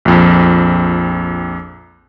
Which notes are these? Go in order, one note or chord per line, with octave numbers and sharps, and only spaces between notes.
A#1 F2